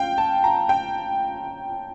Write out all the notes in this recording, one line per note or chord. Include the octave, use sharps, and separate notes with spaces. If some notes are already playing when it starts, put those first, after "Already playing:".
Already playing: C#4 F5 G5
A5
A#5
G5